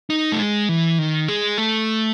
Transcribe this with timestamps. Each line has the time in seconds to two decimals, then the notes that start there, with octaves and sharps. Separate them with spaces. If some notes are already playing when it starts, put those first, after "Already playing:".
0.10 D#4
0.32 A3
0.39 G#3
0.69 E3
0.99 D#3
1.28 G#3
1.58 A3